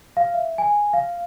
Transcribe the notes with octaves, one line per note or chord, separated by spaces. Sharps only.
F5
E5
G#5
F5